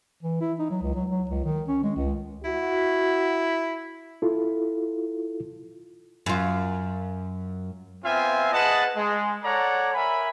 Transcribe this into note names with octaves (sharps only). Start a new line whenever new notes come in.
E3
E4
D#4
F#3
C#2
F#3
F#3
C#2
D#3
C#4
G#3
C#2
E4 F#4
E4 F4 A4
F#2 F4
B3 C4 F4 E5 F5 G#5
G#4 B4 D#5 F#5 A5
G#3
A4 C#5 D5 F#5 A#5
A#4 E5 G#5 B5